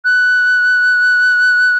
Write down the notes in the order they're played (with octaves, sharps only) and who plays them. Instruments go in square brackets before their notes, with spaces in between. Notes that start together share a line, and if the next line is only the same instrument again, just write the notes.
[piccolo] F#6